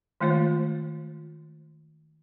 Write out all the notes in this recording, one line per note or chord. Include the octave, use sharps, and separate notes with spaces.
D#3 G#3 A3 F4 C5